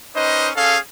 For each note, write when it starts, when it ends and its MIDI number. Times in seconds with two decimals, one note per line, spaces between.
0.15 0.50 61
0.15 0.50 63
0.15 0.50 71
0.15 0.50 72
0.15 0.50 75
0.56 0.77 61
0.56 0.77 68
0.56 0.77 69
0.56 0.77 77